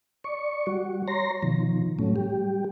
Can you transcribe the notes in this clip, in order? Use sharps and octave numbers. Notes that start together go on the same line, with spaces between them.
D5 C#6
G3 F#4
C#5 A#5 C6 A#6
B2 D#3 F3
A2 F#3 A3 C#4
G3 G4